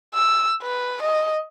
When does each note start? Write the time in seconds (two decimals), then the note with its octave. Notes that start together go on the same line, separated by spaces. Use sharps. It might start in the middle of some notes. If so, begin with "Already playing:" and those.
0.14 E6
0.62 B4
1.02 D#5